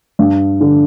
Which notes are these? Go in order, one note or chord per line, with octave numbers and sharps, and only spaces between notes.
G2
D3